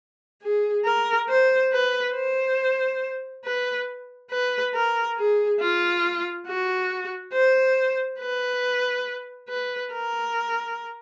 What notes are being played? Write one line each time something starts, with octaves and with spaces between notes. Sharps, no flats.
G#4
A#4
C5
B4
C5
B4
B4
A#4
G#4
F4
F#4
C5
B4
B4
A#4